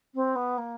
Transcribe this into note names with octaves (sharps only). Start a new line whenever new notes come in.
C4
B3
A#3